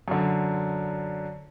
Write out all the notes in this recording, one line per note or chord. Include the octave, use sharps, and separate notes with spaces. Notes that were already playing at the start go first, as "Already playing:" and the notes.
F#2 D3